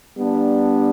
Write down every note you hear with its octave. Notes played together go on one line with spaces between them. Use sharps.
G3 B3 D4